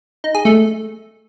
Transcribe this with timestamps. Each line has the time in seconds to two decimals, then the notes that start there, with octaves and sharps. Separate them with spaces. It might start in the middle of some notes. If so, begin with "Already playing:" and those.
0.24 D#4
0.35 G#4
0.45 A3